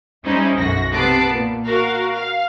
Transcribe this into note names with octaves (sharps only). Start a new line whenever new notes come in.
G3 C#4 D#4 E4 C5
B1 F#2 F#4 A#6
C3 B3 B4 A5 D6 C7
A#2
F#4 A#4 F5
F5